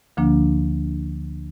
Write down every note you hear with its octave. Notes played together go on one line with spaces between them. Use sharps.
D2 D3 F3 A#3 D4